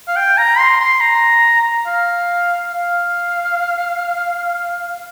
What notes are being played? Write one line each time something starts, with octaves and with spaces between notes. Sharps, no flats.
F5
G5
A#5
C6
C6
A#5
F5
F5